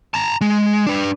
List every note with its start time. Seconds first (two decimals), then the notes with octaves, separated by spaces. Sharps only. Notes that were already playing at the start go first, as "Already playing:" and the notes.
0.14 A5 A#5
0.41 G#3
0.87 D4 B4